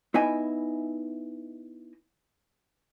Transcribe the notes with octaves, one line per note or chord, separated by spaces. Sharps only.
B3 D#4 E4 D#5 E5 G#5